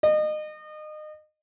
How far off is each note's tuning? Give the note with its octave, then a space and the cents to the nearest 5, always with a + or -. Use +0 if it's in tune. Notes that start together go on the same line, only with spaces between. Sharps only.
D#5 -30